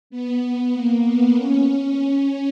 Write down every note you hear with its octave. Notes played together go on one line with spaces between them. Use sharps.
B3
A#3
B3
C#4